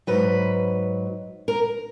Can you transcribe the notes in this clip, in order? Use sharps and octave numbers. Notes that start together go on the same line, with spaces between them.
G#2 F#3 B4
A#4